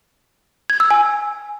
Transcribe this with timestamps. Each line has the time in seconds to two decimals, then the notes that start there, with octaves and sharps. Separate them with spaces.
0.70 G#6
0.80 E6
0.91 G#5